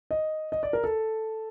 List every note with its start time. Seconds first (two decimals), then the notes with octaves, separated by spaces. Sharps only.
0.11 D#5
0.52 D#5
0.63 D5
0.73 A#4
0.84 A4